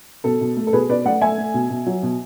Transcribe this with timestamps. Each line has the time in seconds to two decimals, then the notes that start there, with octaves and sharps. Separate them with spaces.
0.24 B2 A4
0.41 B2
0.57 A3
0.67 A4
0.73 B2 G#4 B4
0.89 B2 B4 D5
1.05 A3 D5 F#5
1.21 A3 E5 G#5
1.38 A3
1.54 B2
1.70 B2
1.86 F#3
2.03 B2